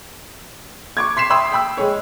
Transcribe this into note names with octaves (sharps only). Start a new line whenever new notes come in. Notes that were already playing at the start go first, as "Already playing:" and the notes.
C#6 D6 G#6
C6 B6 C7 E7
E5 G5 B5 C6 D#6 E6
G5 B5 E6
G#3 G#4 C#5